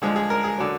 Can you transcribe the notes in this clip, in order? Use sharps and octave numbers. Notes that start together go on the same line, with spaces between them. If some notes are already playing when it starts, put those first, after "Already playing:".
D3 F3 G#3 G#4
G#4
A#4
G#4
D3 F#3